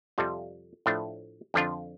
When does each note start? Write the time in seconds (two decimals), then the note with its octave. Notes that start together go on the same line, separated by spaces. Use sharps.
0.18 F2 C3 G3 F4 A4
0.86 A2 F3 A3 D4
1.54 F2 D3 F3 D4 F4